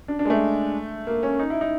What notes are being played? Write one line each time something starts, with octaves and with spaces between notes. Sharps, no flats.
D4
D4
G#3
A3
A#3
C#4
D#4
E4
D#4